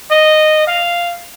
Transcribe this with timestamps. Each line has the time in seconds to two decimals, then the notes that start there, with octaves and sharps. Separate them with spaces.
0.11 D#5
0.68 F5